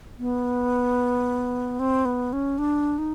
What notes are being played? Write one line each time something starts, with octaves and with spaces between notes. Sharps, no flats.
B3
C4
B3
C#4
D4
D#4